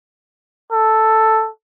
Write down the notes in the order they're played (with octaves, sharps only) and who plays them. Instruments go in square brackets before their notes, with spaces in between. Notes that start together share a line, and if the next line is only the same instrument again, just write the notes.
[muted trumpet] A4